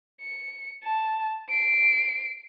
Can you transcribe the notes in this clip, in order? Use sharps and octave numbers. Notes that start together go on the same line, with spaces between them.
C#7
A5
C7 D7